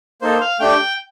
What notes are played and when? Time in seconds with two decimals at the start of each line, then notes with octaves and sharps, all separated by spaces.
0.22 A#3 D#4 A4 C5
0.41 F5
0.60 A3 D4 G4 G5